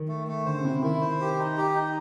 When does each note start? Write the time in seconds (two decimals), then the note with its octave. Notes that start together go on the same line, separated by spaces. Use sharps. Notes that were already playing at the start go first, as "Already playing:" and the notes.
Already playing: D#3
0.08 A3
0.27 A3
0.46 D3 C5
0.58 C#3
0.64 C3 E4
0.82 D#3 E4
1.01 C5
1.20 G4
1.39 D#4
1.57 G4
1.76 D#4